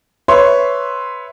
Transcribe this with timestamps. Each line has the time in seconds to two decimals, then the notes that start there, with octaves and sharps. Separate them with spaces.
0.28 B4 C#5 E5 C6